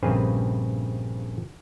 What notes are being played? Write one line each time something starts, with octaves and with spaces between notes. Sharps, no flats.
A#1 G2 C#3 C4 B4 G#5